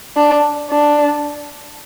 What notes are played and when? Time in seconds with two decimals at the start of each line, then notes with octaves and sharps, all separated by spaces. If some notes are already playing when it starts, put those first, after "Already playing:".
0.17 D4
0.70 D4